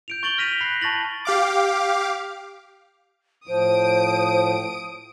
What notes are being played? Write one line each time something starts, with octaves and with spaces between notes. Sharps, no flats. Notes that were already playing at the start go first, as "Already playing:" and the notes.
G6 D7 F7
C#6 G6 A6 D7 F#7 G7
F6 A#6 B6 D#7 F7
B5 F#6 A#6 C7
A5 C#6 A6 A#6 F#7
G4 F5 D6
A2 F3 C5 D#6 D7